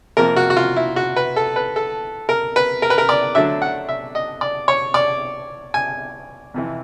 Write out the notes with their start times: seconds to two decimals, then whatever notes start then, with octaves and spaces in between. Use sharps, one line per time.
0.17 F2 C3 F3 A#3 A#4
0.36 F#4
0.50 F#4
0.57 F4
0.76 E4
0.96 F#4
1.16 B4
1.36 A4
1.56 B4
1.76 A4
2.29 A#4
2.56 B4
2.82 A#4
2.90 B4
2.98 A#4
3.09 D5
3.35 D3 F#3 A3 D4 E5
3.62 F#5
3.89 E5
4.15 D#5
4.41 D5
4.68 C#5
4.94 D5
5.74 G#5
6.54 F2 C3 E3